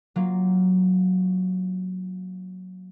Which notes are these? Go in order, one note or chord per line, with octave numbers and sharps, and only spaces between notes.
F#3 A#3 F4